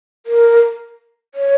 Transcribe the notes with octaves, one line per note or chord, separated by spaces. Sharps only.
A#4
C#5